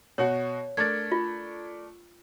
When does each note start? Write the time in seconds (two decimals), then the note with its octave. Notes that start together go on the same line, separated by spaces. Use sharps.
0.18 B2 F#4 C#5 F#5
0.77 A3 D4 A#4 G#6 A6
1.12 F4